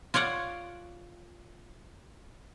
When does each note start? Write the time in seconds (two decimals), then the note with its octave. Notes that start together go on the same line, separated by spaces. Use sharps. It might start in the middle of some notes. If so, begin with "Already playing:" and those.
0.14 F4 C#5 D5 F5 F#5